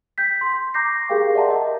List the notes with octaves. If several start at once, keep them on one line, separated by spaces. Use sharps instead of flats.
G5 G6 B6
C6
A#5 C#6 D6 G6 A#6 C7
G4 G#4 A#4 F5 G5
D5 E5 F#5 A5 A#5 C6
A#4 D#5 F#5